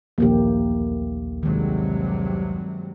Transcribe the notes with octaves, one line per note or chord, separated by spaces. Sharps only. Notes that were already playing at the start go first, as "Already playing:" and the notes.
A#1 D#2 A3 A#3 G4
G2 C3 D#3 F#3 G#3